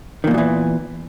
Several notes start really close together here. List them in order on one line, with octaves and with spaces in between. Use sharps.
D#3 A#2 E2 F#3 E3